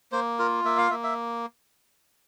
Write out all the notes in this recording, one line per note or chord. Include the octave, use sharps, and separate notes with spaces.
A#3 C5
F4 A#4
A#3 E5
F5
A#3 E5
E5